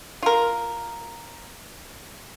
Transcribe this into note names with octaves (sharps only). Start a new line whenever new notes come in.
F4 A#4